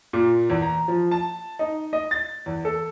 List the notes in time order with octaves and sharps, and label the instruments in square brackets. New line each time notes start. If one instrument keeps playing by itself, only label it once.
[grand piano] A#2
E2
A#5
F3
A5
D#4
D#5
A6
E2
A4